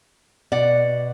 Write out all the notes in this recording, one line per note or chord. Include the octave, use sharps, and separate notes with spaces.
B2 D5 F#5